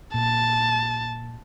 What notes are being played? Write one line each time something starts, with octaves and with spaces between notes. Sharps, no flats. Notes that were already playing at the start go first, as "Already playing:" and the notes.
A#2 A5